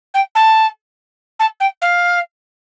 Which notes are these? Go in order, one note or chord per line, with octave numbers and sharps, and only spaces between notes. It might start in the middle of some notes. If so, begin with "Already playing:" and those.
G5
A5
A5
G5
F5